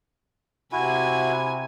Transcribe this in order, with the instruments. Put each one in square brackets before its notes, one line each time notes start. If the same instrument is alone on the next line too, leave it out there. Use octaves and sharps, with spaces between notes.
[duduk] C3 [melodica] E4 F#4 [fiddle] G#5